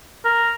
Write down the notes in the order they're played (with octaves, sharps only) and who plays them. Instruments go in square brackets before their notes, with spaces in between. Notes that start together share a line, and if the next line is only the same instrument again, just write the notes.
[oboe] A#4